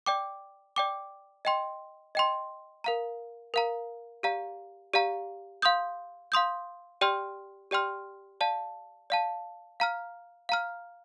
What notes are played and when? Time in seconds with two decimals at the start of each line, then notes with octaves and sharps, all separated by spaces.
0.06 D5 G5 D6
0.76 D5 G5 D6
1.45 D#5 G5 C6
2.15 D#5 G5 C6
2.84 A#4 F5 A#5
3.54 A#4 F5 A#5
4.23 G4 D5 F5 A#5
4.93 G4 D5 F5 A#5
5.62 F5 C6 D#6 G6
6.32 F5 C6 D#6 G6
7.01 G4 D5 G5 C6 F6
7.71 G4 D5 G5 C6 F6
8.41 D5 F5 A5
9.10 D5 F5 A5
9.80 F5 A#5 F6
10.49 F5 A#5 F6